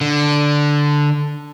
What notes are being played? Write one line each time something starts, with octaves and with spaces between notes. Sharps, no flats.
D3